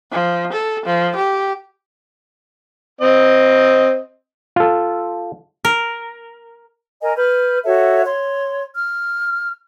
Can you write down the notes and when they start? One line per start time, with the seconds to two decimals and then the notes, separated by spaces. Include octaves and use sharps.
0.12 F3
0.52 A4
0.86 F3
1.16 G4
3.01 C4 D#5
4.56 F4 A4
5.65 A#4
7.03 A#4 D#5 G#5
7.17 B4 F6 G6
7.65 F#4 A4 C#5 E5
8.05 C#5 C6
8.75 F6